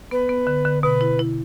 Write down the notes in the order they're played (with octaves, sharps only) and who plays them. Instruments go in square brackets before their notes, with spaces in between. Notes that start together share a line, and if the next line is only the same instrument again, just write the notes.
[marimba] B3 [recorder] B4
[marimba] B3
D3
D3
[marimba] B2 [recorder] B4
[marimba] E4
E4